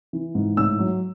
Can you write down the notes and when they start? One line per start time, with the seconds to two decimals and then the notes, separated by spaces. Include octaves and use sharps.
0.13 E3
0.35 G#2
0.57 A2 E6
0.79 F#3